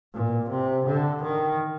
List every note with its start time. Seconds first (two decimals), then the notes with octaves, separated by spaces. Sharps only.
0.14 A#2
0.50 C3
0.87 D3
1.23 D#3